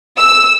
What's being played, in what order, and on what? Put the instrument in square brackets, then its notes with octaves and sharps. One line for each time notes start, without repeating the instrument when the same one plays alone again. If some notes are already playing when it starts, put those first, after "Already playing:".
[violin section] E6